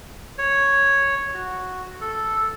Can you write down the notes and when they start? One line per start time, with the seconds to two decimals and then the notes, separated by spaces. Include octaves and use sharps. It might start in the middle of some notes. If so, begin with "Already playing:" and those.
0.38 C#5
1.34 F#4
2.01 A4